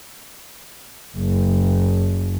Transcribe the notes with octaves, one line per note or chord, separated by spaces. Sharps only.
F#1